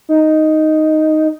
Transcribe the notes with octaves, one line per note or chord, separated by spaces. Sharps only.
D#4